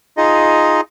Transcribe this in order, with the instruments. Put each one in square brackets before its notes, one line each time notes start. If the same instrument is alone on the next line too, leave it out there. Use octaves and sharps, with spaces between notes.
[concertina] D#4 F4 G#4 D#5